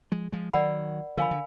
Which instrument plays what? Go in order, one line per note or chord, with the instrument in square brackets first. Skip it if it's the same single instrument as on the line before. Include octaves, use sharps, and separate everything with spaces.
[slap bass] F3 G#3
F3 G#3
[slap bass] D#3 F#3 [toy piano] A#4 D5 F#5 B5
[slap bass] D3 F3 [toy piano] A#4 F5 G#5 B5
[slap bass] D3